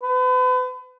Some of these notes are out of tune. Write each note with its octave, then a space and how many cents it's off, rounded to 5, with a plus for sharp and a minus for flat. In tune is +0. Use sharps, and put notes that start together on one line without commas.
B4 +40